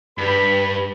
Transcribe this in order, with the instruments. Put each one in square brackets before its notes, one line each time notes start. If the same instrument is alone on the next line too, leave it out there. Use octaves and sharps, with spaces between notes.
[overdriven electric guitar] G2 G3 [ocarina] B4 [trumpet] B5